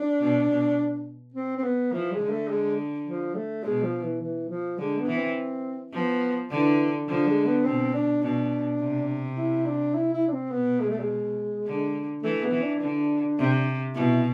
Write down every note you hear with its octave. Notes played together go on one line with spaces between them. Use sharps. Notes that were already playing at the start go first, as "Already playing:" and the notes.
Already playing: D4
B2
B2
C4
C4
B3
E3 F3
G#3
D3
A3
G#3
F3
A3
B2 G#3
F3
E3
E3
F3
D3 G#3
B3
E3
C4
F3 B3
D3 E3
D3 F3
G#3
B3
B2 C4
D4
B2 D4
C3
E4
D4
E4
E4
D4
C4
B2 B3
G#3
A3
G#3
D3
E3 A3
B3
E3
D4
D3
C3
B2 E4